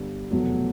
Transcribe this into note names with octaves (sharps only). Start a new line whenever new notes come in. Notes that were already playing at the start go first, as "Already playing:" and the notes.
Already playing: G1 G2 D3 G3
F1 E2 B2 F#3 A3